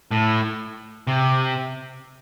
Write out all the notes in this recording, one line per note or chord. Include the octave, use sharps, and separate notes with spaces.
A2
C3